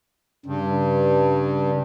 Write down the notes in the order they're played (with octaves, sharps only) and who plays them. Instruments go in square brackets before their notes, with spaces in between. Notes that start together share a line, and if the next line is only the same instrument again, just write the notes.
[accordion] G2 [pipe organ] C#3